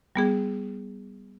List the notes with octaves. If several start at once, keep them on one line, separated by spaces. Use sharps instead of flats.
G3 B3 G#4